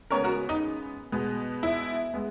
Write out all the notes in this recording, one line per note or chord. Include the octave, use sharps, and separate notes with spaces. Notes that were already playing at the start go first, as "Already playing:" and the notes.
C#3 G#3 B3 A#4 C#5
F#4 A#4
D#4
B2 G#3 B3
E4
G#3 B3